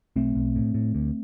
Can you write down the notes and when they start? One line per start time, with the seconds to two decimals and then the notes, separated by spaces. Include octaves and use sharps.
0.16 B1 A3 C4
0.35 B1
0.56 A2
0.74 A2
0.95 D2